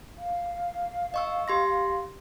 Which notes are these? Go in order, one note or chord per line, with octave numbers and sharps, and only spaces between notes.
F5
D#5 C#6 E6
G4 C6 A#6